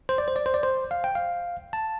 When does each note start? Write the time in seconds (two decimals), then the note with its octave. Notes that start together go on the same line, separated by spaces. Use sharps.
0.09 C5
0.18 D5
0.28 C5
0.36 D5
0.46 C5
0.54 D5
0.63 C5
0.91 F5
1.04 G5
1.15 F5
1.73 A5